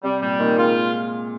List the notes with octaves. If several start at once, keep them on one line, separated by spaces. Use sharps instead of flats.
C3 G3
A#2 G3
A#2 D#3
G#3 F4